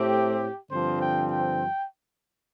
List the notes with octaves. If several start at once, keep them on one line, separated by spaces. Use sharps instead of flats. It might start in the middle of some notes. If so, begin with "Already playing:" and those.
Already playing: A2 A3 C4 G4
G2 D3 F3 C4 C5
G5
G5